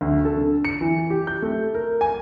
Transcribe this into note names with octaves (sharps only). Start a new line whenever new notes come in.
D2
A4
D3
C#7
E3
G4
G6
A3
A#4
G#5